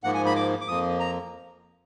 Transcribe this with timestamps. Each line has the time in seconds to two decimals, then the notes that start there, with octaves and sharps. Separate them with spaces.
0.04 G#2 F3 A#3 F#5
0.14 G#5
0.26 B5
0.36 D6
0.61 D6
0.68 F2 F3 A#3 D#6
1.00 A#5